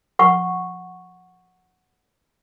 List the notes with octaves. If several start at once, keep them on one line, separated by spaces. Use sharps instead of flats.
F#5 C#6